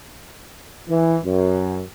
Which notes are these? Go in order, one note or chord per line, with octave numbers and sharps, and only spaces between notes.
E3
F#2